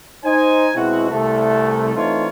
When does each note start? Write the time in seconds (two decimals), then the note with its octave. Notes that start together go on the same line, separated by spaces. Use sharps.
0.24 D#4 C5 G#5
0.75 B2 G#3 C4 E4 F#4
1.11 C2 A3
1.96 E3 A3 C4 D#4 F4 C#5